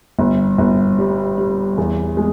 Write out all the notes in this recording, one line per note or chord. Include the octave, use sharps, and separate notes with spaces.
G1
G1
G3
G3
E2
G#3